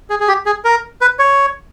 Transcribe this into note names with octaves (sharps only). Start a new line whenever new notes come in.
G#4
G#4
G4
G#4
A#4
B4
C#5